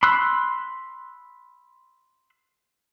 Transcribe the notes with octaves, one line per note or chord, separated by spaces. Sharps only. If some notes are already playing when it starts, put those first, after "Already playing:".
B5 C6 E6 F#6